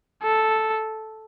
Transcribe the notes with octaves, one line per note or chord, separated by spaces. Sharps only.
A4